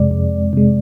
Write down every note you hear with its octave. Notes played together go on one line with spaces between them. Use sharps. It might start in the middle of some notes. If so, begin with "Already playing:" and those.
Already playing: F2 C3 G#3 D5
F2
C3 G#3